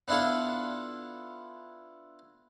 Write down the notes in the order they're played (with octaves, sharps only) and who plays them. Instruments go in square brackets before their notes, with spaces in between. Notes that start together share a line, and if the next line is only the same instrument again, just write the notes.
[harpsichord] B3 D4 E4 F4 A4